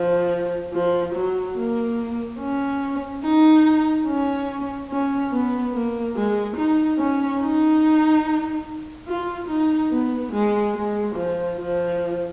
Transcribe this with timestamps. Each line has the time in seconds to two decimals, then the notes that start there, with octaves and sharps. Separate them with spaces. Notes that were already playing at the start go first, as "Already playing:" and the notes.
Already playing: F3
0.73 F3
1.14 F#3
1.57 A#3
2.39 C#4
3.23 D#4
4.07 C#4
4.90 C#4
5.32 B3
5.74 A#3
6.16 G#3
6.56 D#4
6.98 C#4
7.40 D#4
9.07 F4
9.48 D#4
9.91 B3
10.32 G#3
10.74 G#3
11.15 F3
11.57 F3